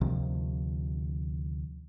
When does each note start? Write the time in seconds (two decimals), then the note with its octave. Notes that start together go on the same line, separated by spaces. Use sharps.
0.01 D2 C3 D#3 F3